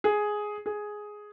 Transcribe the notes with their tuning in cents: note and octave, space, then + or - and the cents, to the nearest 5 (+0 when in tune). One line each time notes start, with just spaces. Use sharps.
G#4 +5
G#4 +5